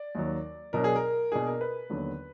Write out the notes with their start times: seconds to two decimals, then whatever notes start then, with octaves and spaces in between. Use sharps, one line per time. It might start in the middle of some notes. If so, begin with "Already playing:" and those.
Already playing: D5
0.15 D#2 D#3 F#3
0.73 B2 F#3 D4 A#4
0.84 G#4
0.96 A#4
1.31 B2 A#3 D4 G#4
1.47 A#4
1.61 B4
1.90 D#2 D3 F#3 B3